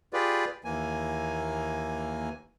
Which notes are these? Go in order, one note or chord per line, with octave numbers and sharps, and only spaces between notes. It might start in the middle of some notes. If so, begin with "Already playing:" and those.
F4 G4 G#4 B4 D5
D#2 E3 A#3 G#5